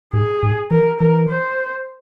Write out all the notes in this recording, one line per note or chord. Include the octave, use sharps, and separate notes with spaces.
G#2 G#4
G#2
E3 A#4
E3 A#4
C5